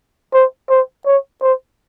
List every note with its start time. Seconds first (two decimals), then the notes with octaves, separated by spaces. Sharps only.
0.34 C5
0.70 C5
1.06 C#5
1.42 C5